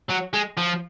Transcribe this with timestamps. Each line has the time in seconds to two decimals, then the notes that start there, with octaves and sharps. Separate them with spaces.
0.09 F#3
0.33 G#3
0.58 F3